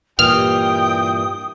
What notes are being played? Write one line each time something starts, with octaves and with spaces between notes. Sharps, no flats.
G2 A#2 E3 G5 D#6 F6